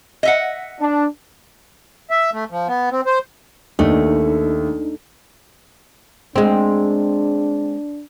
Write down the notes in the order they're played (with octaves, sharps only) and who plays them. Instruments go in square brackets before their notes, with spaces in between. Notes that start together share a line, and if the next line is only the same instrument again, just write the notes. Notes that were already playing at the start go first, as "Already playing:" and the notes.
[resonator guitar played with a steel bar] D#5 E5 F#5
[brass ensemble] D4
[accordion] E5
A3
F3
B3
C4
C5
[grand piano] D#2 [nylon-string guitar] A3 [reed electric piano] D4 D#4
[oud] G#3 C4 [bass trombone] D4